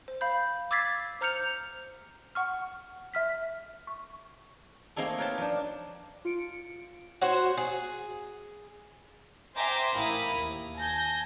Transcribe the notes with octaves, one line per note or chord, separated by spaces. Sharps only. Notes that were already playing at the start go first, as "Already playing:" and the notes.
C5
F5 B5 G6
D6 E6 G#6 A6 B6 C7
C5 A#5 F6 G6 C#7 F7
F#5 C#6 F6
E5 F6 B6
C#6
A3 A#3 C4 D#4 G#4 A4
A#4 B4 C#5 G5 A5
F3 D4
F4 C#7 D7
F#4 C5 C#5 F#5
G#4
C5 E5 G5 G#5 A#5 D6
A1 E4 A#4 F5 B5 D#6
D#2
G#5 A5 G6 A#6